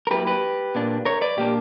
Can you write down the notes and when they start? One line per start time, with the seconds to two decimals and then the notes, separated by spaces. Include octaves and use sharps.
0.07 A#4
0.11 F#3 A#3 E4 G4 B4
0.27 G4 B4
0.75 A#2 A#3 D4
1.05 A#4 C#5
1.21 B4 D5
1.37 A#2 A#3 D4 G4